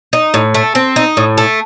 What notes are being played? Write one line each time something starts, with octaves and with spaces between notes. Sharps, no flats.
D#4
A2
A3
C4
D#4
A2
A3